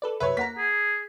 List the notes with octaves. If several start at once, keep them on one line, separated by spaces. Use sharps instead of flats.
A4 B4 D5
C2 F#2 B4 C#5 E5
A#3 F#5 A#5 B6
G#4